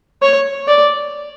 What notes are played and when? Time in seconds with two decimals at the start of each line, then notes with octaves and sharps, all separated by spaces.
0.22 C#5
0.68 D5